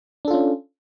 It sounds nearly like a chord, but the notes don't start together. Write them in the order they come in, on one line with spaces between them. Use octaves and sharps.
D4 A4 F4 C#4